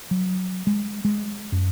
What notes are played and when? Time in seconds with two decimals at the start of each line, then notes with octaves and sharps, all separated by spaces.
0.11 F#3
0.67 G#3
1.05 G#3
1.52 F#2